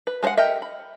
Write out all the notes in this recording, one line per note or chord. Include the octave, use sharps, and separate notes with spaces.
B4
G#3 A4 C5 F5 F#5
G4 A4 A#4 D#5 E5
B5